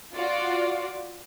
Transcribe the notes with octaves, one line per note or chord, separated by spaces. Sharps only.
F4 F#4 D5